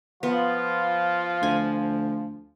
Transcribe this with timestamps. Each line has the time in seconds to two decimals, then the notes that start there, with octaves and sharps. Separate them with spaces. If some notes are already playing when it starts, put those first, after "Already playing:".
0.23 F3 B3 F4
1.43 D2 G#5